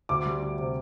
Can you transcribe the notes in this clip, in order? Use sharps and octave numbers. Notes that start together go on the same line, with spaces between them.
D2 D6
G3
D2
C3